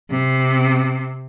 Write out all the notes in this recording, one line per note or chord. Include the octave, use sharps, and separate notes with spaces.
C3